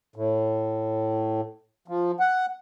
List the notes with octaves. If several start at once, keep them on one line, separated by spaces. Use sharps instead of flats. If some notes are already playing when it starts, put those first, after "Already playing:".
A2
F3
F#5